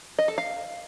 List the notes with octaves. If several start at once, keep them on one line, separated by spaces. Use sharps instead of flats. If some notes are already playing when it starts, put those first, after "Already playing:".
D#5
A4
F5